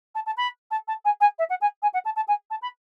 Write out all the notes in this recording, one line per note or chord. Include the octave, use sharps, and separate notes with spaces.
A5
A5
B5
A5
A5
G#5
G#5
E5
F#5
G#5
G#5
F#5
A5
A5
G#5
A5
B5